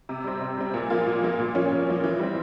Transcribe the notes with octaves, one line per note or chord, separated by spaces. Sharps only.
C3
G3 C4
C3
G3 C4
A#2
F3 A#3 F4
A#2
F3 A#3 F4
A#2
F3 A#3 C#4
A#2
F3 A#3 C#4
E3
G3 C4